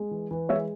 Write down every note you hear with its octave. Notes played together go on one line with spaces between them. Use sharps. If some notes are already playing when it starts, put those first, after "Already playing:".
Already playing: G#3
E3
E3
G#3 C#5 E5